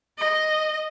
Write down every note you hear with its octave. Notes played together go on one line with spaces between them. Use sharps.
D#5